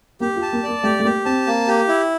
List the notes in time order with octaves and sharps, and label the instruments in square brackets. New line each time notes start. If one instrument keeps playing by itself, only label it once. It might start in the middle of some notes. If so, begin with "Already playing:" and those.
[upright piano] A#3 [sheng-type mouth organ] G4
[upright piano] F4
[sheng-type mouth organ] A5
[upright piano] A#3
[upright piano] A#3 [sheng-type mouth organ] D5
[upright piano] A3 [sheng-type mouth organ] G4
[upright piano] A3
[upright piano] A#3 [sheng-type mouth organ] G4
[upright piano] C4 [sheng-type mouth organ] A5
[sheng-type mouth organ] A#3
G4
E4